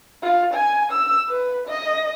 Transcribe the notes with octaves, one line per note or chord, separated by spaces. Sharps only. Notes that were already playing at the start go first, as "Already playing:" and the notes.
F4
G#5
E6
B4
D#5